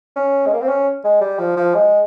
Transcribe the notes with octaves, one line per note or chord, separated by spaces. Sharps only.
C#4
G#3
A#3
C4
C#4
G#3
G3
F3
F3
G#3